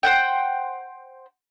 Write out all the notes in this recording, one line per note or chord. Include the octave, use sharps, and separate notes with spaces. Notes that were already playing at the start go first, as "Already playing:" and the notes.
C5 F#5 G5